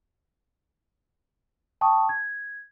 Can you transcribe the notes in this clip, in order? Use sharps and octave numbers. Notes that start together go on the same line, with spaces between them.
G5 A5 C#6 D#6
G#6